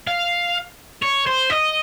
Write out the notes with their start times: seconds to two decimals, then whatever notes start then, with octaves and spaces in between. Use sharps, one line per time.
0.07 F5
1.02 C#5
1.26 C5
1.50 D#5